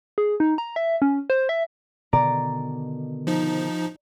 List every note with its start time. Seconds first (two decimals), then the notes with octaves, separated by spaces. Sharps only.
0.18 G#4
0.40 D#4
0.58 A#5
0.76 E5
1.02 C#4
1.30 C5
1.49 E5
2.13 B2 D3 D#3 D5 A#5
3.27 F3 D#4